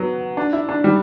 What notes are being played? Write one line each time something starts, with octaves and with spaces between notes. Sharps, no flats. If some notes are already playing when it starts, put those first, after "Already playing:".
Already playing: F#3 B3
D4
E4
D4
G3